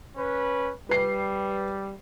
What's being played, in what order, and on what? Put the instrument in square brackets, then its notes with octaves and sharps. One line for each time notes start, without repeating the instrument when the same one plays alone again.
[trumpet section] C#4 B4
[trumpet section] G3 [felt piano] B4 C7